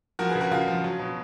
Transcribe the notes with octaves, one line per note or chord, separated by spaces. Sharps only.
F3 F#4 A#4
G#4 B4
C#3
F#4 A#4
C#3 F4 G#4
F3
F#3
B2